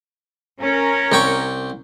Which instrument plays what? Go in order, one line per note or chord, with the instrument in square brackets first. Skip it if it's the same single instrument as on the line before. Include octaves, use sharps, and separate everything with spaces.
[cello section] C#4 A#4 C#5
[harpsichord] C2 G5 C#6